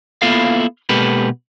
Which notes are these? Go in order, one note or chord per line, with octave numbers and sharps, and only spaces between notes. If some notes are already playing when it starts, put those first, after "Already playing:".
A#3 B3 E4 F4 A4 F5
B2 G#3 A#3 G4 A4 B4